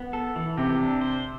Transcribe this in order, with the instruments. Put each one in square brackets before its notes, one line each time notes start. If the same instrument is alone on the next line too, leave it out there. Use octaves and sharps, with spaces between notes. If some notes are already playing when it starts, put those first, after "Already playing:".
Already playing: [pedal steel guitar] B3
A4
E3
[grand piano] C3 [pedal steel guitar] G4
[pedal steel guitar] D4
C5